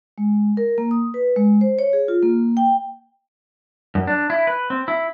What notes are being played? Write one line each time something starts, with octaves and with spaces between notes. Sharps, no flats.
G#3
A#4
A#3
D#6
B4
G#3
C5
C#5
G#4
F4
A#3
G5
F#2
D4
E4
B4
C4
E4